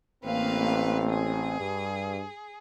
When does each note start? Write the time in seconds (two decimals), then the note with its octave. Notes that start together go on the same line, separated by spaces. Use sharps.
0.24 A1 A#3 C4 B4 F5
1.08 G#4
1.59 G2